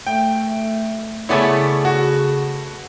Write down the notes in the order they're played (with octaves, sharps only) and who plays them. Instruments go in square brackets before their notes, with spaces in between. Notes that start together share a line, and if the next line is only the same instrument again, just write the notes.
[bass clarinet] A3 [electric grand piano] G5
[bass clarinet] C#3 [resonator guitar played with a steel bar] A3 B3 C#5 [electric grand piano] E4 D5 G#5
[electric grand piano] F#4